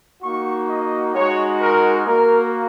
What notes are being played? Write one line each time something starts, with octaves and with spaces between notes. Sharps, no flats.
A#3 D#4 F#4 C#6
D#5
G#3 D#4 F#4 C#5
A#4
A#3 F#4 A#4